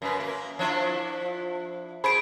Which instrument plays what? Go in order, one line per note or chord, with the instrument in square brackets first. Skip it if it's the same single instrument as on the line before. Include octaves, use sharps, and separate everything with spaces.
[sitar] F#2 B4
A#3
F3 D4 E4
[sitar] G#4 C5 [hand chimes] B5 D7